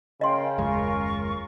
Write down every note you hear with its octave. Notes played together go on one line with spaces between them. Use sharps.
C#3 A#4 D#5 F5 G5 C6
F#1 D#2 G#3 F4 A#4 C#6